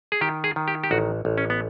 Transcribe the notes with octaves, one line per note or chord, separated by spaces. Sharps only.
G#4
D#3 G4
G#4
D#3
G4
G4
A1 F#4
A1
C#4
B3